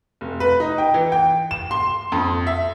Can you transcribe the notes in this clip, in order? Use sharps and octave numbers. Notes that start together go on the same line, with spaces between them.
F1
B4
D#4
G5
E3
G5
E7
C6
F2
E5